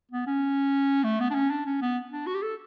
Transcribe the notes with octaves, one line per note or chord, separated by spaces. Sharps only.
B3
C#4
A3
B3
D4
C#4
D4
C#4
B3
D4
F#4
G4
A4